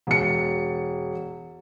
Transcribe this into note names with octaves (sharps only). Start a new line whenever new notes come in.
E1 C#7